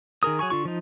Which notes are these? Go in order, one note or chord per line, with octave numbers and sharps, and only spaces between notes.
D#3 G#4 A#4 D#6
F#3 G#4 G#5 C#6
D3 F4 C#6
F3 D#4